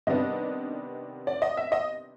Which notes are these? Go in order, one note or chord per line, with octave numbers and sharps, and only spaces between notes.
C3 D#3 G3 B3 D4 D#5
D5
D#5
E5
D#5